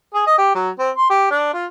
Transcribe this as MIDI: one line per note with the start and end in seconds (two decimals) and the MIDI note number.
0.14 0.26 68
0.27 0.36 75
0.38 0.55 67
0.55 0.70 54
0.79 0.90 60
0.96 1.10 84
1.10 1.28 67
1.31 1.54 62
1.54 1.66 65